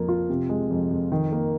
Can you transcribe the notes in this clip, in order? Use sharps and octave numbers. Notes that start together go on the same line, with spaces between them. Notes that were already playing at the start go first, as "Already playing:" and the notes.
Already playing: F2 F3 A#3
F4
C3
G#3
F2
F2
D#3
A#3